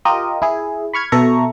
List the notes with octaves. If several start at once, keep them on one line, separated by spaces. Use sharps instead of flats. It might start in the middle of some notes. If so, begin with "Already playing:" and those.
F4 G4 A#4 D#5
E4 G#4
B5 C#6 F6 G#6
B2 A4 E5 A#5 C#6